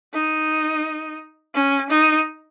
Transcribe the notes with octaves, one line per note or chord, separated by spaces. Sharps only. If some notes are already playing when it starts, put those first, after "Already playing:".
D#4
C#4
D#4